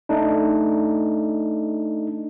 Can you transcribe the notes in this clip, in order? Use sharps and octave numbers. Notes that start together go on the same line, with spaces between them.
A3 D4 D#4